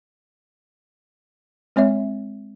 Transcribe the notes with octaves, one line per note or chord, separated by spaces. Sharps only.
G#3 C4 C#5 E5